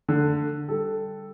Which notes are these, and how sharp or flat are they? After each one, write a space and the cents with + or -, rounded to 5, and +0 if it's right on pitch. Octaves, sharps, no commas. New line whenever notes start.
D3 +0 A3 +25 A4 +15
G3 +0 A4 +0